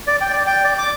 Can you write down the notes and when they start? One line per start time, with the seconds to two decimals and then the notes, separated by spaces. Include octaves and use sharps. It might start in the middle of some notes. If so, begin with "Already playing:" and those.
0.07 D5
0.21 G5
0.33 D5
0.47 G5
0.64 D5
0.78 D6